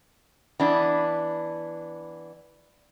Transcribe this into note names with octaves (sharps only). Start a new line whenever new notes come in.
E3 B3 D4